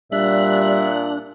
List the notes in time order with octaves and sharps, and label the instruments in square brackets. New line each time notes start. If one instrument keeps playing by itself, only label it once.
[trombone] A#2 [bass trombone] G3 [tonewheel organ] D4 F#6 [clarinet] E5